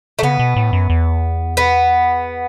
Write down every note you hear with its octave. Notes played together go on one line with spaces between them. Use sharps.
A3
C#3 B3
B2
A2
F#2
E2
B3